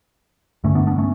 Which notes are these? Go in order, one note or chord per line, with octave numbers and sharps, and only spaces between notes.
G2 D3 A3 C#4
B3 D4
B3 D4
A3 C#4